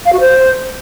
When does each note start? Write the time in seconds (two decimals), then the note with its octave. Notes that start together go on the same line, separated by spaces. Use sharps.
0.05 F5
0.13 F#4
0.20 C5